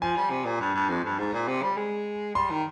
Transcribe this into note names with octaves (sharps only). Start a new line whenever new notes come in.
F3 G#5
G3
C3
A#2
G2
G2
F2
G2
G#2
A#2
C3
G3
G#3
G3 C6
D#3